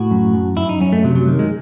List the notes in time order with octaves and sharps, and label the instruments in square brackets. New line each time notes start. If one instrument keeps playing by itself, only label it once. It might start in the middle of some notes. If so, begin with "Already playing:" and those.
Already playing: [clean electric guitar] A2 F#4
F#2
F#2
F#2 E4
D#4
F#2 C#4
A3
C3 F#3
F#3
D#3
G#3